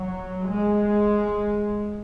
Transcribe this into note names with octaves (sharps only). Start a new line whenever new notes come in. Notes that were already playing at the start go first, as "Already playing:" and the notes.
Already playing: F#3
G#3